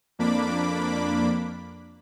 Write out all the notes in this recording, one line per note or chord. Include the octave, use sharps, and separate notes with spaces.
F2 A#3 D4 B5 D6